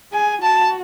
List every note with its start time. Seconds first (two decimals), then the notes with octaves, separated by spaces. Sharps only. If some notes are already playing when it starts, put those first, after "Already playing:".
0.13 G#4 G#5
0.43 F#4 A5